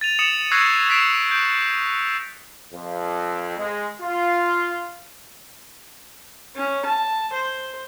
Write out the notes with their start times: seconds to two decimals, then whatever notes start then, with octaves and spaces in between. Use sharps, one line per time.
0.01 A6 D#7 F7
0.19 D#6 C#7 E7 F#7
0.51 C#6 E6 F#6 G#6 A#6 C7
0.88 E6 G#6 B6 C7 D7 E7
1.31 G6 D7
2.74 F2
3.58 G#3
4.01 F4
6.55 C#4
6.86 A5
7.33 C5